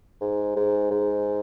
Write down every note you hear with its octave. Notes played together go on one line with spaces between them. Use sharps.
G#2
G#2
G#2